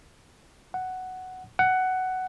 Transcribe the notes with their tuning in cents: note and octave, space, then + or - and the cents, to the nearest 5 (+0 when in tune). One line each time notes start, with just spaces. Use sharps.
F#5 +5
F#5 +10